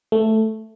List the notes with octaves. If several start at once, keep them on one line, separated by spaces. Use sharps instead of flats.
A3